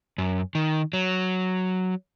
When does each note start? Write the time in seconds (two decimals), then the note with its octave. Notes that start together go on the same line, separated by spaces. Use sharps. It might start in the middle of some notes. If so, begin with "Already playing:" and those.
0.18 F#2
0.55 D#3
0.93 F#3